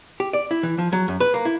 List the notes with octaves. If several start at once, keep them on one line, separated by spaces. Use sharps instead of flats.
G4
D5
E4
E3
F3
F#3
F#2
B4
A#3
E4